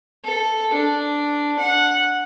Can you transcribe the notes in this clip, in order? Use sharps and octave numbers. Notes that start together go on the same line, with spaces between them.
A4
D4
F#5